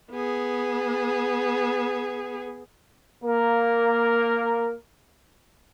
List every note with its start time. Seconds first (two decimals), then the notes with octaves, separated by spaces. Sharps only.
0.11 B3 G#4
3.24 A#3 A#4